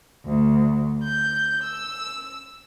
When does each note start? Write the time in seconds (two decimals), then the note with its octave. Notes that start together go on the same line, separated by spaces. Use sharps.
0.25 D2
1.04 G6
1.63 E6